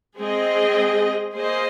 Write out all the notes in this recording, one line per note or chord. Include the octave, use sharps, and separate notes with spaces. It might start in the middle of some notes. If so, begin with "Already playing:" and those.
G#3 C4 G#4 D#5
A#3 G#4 C5 D#5